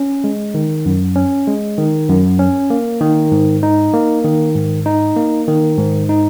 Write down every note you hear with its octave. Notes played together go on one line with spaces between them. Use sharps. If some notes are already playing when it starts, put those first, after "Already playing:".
Already playing: C#4
G#3
D#3
F#2
C#4
G#3
D#3
F#2
C#4
A#3
D#3
G#2
D#4
A#3
D#3
G#2
D#4
A#3
D#3
G#2
D#4